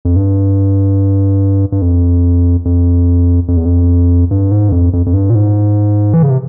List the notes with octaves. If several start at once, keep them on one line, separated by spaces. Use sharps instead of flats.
F2
G2
G2
F2
F2
F2
E2
F2
G2
G#2
G2
F2
F2
F2
G2
A#2
G#2
E3
C#3
C3